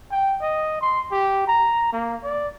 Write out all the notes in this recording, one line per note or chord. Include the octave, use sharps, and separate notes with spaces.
G5
D#5
C6
G4
A#5
A#3
D5